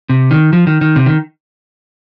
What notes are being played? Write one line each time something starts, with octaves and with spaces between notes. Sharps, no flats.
C3
D#3
F3
D#3
D#3
C3
D#3